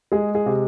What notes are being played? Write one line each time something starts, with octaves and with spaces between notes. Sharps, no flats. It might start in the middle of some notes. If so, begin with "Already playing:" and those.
G#3 G#4
G#4
C3